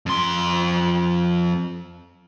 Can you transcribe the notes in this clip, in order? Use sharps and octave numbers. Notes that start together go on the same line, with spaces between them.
F2 C6